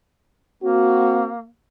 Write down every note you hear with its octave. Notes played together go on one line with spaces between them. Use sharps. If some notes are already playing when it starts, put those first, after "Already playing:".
A#3 C4 F#4